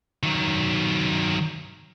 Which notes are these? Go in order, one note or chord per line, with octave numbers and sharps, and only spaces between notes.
D#3 F#3